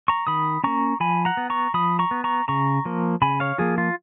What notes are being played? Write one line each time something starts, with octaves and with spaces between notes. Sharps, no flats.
A#5 C#6
D#3 B5 D#6
A#3 C#4 A#5 C#6
F3 G#5 B5
F#5 A#5
B3
A#5 C#6
F3 B5 D#6
A#5 C#6
B3
A#5 C#6
C#3 A#5 C#6
F3 A#3
C#3 G#5 B5
C#5 F5
F3 A#3 F4 G#4
F4